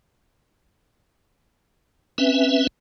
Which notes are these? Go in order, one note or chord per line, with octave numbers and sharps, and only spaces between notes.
C4 C#4 B4 E5